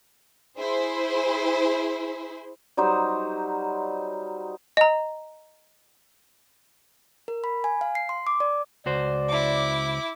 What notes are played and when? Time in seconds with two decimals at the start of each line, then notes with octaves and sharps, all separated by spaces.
0.59 E4 G#4 C5
2.77 F#3 G3 D#4 C5
4.77 D#5 A#5
7.28 A#4
7.44 B5
7.64 G#5
7.81 F5
7.95 C7
8.09 C6
8.27 D6
8.40 D5
8.86 C#2 F#4 C5 D5
9.29 E4 D6